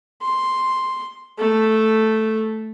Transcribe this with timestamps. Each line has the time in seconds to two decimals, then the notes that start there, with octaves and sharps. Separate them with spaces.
0.22 C6
1.39 A3